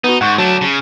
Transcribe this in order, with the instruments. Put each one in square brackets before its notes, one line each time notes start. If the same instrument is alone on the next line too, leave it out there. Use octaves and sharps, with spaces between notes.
[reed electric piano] B3 F#4 [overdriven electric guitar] D#4
[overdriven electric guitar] G#2 [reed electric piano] F#5 C#6 G6
[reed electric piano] F#3 A5 [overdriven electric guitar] A3 D4
[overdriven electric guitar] C#3